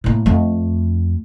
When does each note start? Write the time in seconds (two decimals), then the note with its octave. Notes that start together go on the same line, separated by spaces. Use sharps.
0.04 A2 A#3
0.26 F2 A3